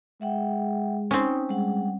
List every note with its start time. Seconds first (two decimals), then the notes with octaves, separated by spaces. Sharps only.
0.21 G#3 E5 F#5 G5
1.11 C4 C#4 D#4
1.49 G3 G#3 F#5